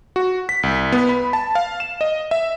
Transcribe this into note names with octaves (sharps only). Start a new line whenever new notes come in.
F#4
B6
C2
B3
B5
A5
F5
E7
D#5
E5